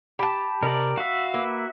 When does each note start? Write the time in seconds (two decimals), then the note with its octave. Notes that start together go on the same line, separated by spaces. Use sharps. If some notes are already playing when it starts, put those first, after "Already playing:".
0.19 G4 A5 B5
0.63 C3 A#4 D5 D#5
0.97 F#4 E5 F5
1.34 A#3 B4